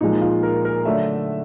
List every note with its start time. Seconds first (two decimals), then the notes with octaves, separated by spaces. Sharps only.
0.01 A#2 F3 G#3 D#4
0.21 F4
0.43 A#4
0.65 A#4
0.85 D3 F#3 A3 E5